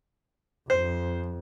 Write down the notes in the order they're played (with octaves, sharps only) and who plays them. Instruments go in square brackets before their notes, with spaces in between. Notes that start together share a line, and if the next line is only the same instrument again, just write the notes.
[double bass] F2 [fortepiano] C5